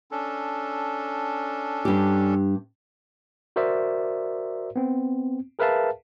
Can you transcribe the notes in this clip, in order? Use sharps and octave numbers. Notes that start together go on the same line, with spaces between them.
C#4 D4 A4
G2 G4
F#4 A#4 C5 D5 E5
B3 C4
G#4 A#4 B4 E5 F5 A5